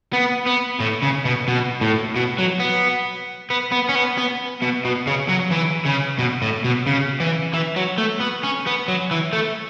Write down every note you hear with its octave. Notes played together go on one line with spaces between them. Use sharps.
B3
B3
A2
C#3
B2
B2
A2
B2
F#3
B3
B3
B3
C#4
B3
B3
B2
B2
C#3
F#3
E3
C#3
B2
A2
B2
C#3
E3
E3
F#3
A3
B3
C#4
B3
F#3
E3
A3